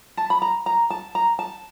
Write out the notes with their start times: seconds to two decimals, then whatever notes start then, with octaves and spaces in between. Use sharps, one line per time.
0.17 A5
0.30 B5
0.42 A#5
0.66 A#5
0.90 A5
1.15 A#5
1.39 A5